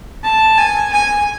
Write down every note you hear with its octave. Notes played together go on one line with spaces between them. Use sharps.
A5
G#5
G#5